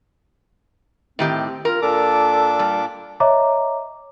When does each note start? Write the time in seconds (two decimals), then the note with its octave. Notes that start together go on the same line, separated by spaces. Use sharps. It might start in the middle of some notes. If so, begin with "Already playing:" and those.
1.19 A2 D#3 C4 G4
1.65 F4 A#4
1.82 A#2 D4 A4 D6
2.59 G3
3.20 C#5 D#5 E5 A#5 D6